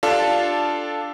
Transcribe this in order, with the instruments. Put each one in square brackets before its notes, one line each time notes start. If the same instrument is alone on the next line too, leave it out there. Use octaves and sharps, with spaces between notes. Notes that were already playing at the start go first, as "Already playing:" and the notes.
[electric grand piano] D4 F4 G4 A4 F5 A5